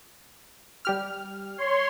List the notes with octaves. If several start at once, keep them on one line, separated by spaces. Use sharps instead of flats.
G3 G4 F6
C#5 C6